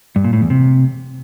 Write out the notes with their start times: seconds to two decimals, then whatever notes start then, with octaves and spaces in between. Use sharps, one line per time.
0.16 G2
0.24 A#2
0.33 A2
0.42 E2
0.50 C3